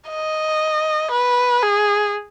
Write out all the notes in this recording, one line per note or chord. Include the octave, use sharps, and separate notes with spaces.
D#5
B4
G#4